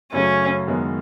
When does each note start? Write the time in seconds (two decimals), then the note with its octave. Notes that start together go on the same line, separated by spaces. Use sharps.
0.12 F#2 C#3 F#3 A3 C#4
0.67 F#2 D#3 G#3 B3